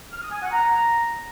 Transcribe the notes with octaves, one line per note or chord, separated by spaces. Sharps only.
F6
D#6
G#5
F#5
A#5